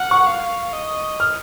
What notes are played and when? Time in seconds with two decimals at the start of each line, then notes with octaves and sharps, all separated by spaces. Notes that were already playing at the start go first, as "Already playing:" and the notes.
Already playing: F#5 F6
0.11 C#6
0.27 F5
0.73 D#5
1.20 F6